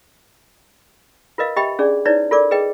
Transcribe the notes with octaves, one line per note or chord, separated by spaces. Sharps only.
F4 A#4 B4 D#5 F5
G4 D#5 E5 G5 B5
C#4 D4 G#4 D5
D#4 E4 B4 C#5 D5
F4 A4 A#4 D5 D6
G#4 B4 D#5 G5